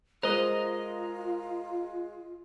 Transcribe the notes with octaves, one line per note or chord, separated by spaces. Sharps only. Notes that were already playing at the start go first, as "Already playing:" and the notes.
G#3 F4 A#4 C5 D#5 A#6